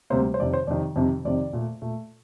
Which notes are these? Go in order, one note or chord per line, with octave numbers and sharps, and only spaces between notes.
D2 C3 G3 A#3 C5
C5
F2 C3 D#3 D5
C5
F2 C3 D#3 D5
F2 C3 D#3
F2 C3 D#3 D5
A#2 A3
A#2 A3